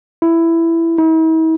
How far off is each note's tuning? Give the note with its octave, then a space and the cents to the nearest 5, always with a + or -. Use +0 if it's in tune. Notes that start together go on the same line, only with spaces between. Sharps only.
E4 +10
E4 -45